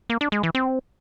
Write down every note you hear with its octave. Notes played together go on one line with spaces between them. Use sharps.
A#3
D4
G#3
E3
C4